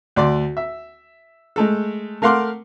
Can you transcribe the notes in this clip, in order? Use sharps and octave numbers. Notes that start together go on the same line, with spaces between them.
D2 D5 C6 D6
E5
G#3 A3 A4
A3 A#4 F5 F#5 C6 D6